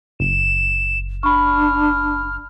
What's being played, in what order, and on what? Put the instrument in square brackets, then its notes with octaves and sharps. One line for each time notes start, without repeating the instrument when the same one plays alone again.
[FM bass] F#1 [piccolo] E7
[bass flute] D4 [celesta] B5 C#6 [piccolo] F6